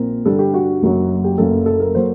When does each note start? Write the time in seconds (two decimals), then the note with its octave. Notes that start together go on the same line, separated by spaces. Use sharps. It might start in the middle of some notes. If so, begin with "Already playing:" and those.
Already playing: A#1 A#2 C4 A#4
0.25 G2 D3 G3 D4 A4
0.39 G4
0.54 F#4
0.82 F#1 F#2 F#3
1.24 G4
1.38 F#1 F#2 F#3 A#3 A4
1.66 A4
1.80 A#4
1.95 F#3 A#3 C5